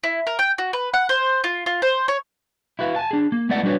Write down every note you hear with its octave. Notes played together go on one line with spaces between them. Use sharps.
E4
A#4
G5
F#4
B4
F#5
C5
F4
F4
C5
C#5
E4 F#4 B4 F5
G#5 A5
D4 G#4
A#3
G#3 A3 B3 E4 D5 F#5
G3 D4 F#4 B4 C#5